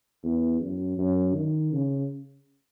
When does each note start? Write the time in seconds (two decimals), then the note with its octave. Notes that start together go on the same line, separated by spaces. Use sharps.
0.23 E2
0.60 F#2
0.98 F#2
1.35 D#3
1.73 C#3